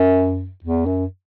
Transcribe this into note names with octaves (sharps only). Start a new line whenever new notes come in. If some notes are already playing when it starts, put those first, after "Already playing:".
Already playing: F#2
E2
F#2